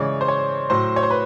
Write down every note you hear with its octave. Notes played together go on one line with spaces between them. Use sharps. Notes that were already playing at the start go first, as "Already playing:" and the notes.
Already playing: C#3 E3 G#3 C#5 D5
C5
C#5
A2 F#3 C5
C#5
C5
B4